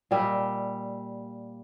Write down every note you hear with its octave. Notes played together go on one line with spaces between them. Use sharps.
A#2 G3 D#5 E5